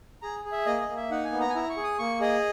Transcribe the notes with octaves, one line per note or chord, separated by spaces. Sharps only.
G#4 A#5
G#4
E5
A#3 D#5
D#5
A#3
E5
D#4 F#5
G#5
B3
A#5
G#5
E4 A#5
C#6
G#4
D#6
A#3 C#6
G#4 D#5